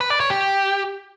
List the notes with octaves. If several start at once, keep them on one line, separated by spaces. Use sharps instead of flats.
B4
D5
C#5
G4